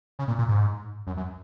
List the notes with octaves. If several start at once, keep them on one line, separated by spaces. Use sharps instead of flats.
C#3
A#2
A#2
G#2
F#2
F#2